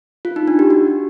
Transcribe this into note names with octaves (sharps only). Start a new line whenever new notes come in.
F4
D#4
D4
G4
F#4